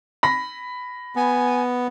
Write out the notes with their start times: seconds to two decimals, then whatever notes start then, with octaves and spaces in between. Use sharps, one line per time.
0.23 B5 A#6
1.16 B3 G#5